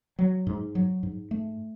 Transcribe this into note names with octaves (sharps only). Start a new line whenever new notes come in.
F#3
G#2
F#3
G#2
A3